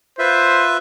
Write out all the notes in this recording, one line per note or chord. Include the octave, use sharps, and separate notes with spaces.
F4 B4 C5 E5